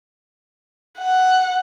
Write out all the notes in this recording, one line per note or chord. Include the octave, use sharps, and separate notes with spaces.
F#5